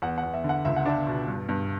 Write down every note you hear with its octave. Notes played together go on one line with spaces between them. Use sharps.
E2 F#5
F#5
E2
E5
D3
F#5
C#2 E5
F#5
D4 E5
B2
G2
G2